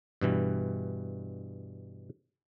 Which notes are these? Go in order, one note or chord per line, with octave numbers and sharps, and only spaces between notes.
G2 B2 E3 G3